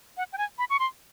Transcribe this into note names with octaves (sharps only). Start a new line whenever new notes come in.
F#5
G5
G#5
B5
C#6
C6